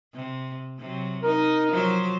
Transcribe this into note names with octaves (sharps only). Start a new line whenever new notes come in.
C3
C3 F#3
D#4 A#4
F3 F#3 C5